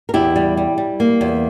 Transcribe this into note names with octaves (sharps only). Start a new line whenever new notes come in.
A#4
E2 E4 G4
G3
G3
G3
A#3
E2